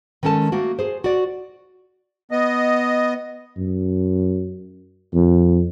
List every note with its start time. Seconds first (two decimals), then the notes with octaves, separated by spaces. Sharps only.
0.23 D#3 G#3 C#4 A4 A5
0.52 A3 A#3 F#4
0.79 G#4 C5
1.04 F#4 D5
2.31 B3 D#5
3.57 F#2
5.14 F2